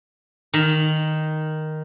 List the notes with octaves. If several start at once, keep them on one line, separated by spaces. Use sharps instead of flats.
D#3